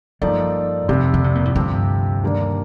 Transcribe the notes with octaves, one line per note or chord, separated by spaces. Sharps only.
G2 F3 A#3 D#4 A4 D5
C2 F2 C3 G3
D3
C3
A#2
A2
D2 G2 C3 F3 C4 G4
D#2 D3 G3 A#3 D4